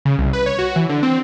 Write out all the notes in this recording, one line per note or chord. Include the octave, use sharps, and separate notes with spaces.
C#3
C2
B4
C#5
F#4
E3
D3
C4